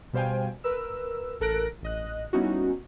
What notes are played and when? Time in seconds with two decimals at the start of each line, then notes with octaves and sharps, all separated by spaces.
0.13 B2 G3 C5 F5 G5 G#5
0.64 A#4 B4 E6
1.40 A1 A4 A#4 F#6 A#6 D7
1.83 A1 D#5 F#6
2.33 G3 B3 C#4 D#4 E4 F#4